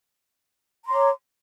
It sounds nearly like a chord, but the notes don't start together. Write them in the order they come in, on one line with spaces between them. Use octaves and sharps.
A#5 C6 C#5 D6